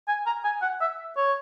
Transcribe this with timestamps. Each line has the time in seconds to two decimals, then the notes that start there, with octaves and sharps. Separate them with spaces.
0.08 G#5
0.26 A#5
0.44 G#5
0.62 F#5
0.81 E5
1.17 C#5